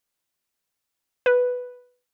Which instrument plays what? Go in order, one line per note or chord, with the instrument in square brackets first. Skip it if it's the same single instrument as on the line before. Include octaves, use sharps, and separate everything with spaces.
[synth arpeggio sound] B4